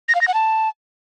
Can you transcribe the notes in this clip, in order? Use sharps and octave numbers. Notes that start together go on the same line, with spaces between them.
A#6
F5
A#6
F#5
A5